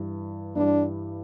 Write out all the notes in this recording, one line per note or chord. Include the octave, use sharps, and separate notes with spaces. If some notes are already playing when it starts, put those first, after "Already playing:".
Already playing: G2 E3 G3
G2 E3 G3 D4